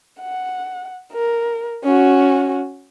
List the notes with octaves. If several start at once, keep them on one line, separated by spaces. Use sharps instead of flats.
F#5
A#4
C#4 F#4